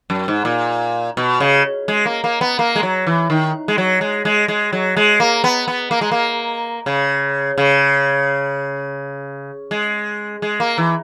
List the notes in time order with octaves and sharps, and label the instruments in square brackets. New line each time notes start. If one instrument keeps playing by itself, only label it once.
[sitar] F#2
G#2
A#2
B2
C#3
G#3
A#3
A#3
B3
A#3
G#3
F#3
E3
D#3
G#3
F#3
G#3
G#3
G#3
F#3
G#3
A#3
B3
B3
A#3
G#3
A#3
C#3
C#3
G#3
G#3
A#3
E3